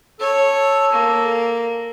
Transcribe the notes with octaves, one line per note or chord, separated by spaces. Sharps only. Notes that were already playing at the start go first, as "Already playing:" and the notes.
A4 C#5
A#3